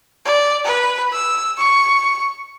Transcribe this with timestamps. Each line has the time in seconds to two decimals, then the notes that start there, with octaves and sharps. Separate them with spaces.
0.25 D5
0.65 B4
1.12 E6
1.58 C#6